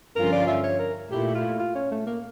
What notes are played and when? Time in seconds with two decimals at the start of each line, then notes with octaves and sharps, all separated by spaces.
0.15 G2 D3 F3 C#4 F4 A#4
0.32 D5
0.48 E5
0.64 C#5
0.79 A#4
1.11 A#2 A3 E4 G4
1.35 F4
1.59 F4
1.75 C#4
1.91 A3
2.06 A#3